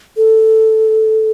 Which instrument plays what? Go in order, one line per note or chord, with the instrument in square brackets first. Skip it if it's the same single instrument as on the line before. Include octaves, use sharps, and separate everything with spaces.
[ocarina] A4